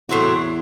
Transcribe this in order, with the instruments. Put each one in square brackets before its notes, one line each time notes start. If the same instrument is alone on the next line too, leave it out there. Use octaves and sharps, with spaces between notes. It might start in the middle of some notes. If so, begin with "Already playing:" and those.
[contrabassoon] E2 [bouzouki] A2 F#3 C4 F#4